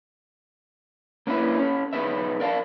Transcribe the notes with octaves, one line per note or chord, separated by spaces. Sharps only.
A#3 C#4 D4 E4 B4 E5
C#4 A4
B1 B3 D#4 G#4 B4 E5
A#4 D5 F5 A5